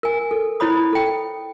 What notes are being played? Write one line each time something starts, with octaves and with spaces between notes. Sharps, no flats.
A#4 G#5
A4
E4 C5 C#5 B5 D#6
A4 G5